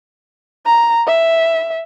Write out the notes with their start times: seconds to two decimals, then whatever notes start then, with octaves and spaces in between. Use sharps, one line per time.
0.66 A#5
1.07 E5